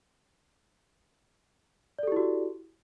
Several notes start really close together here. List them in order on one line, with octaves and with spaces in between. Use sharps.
D5 A4 G4 E4 F#4